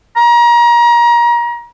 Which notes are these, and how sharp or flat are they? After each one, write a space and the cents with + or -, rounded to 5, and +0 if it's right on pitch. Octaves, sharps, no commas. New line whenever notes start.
A#5 +30